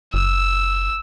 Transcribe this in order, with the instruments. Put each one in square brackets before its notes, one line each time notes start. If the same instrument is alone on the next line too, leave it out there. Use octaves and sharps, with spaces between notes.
[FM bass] F#1 [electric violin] E6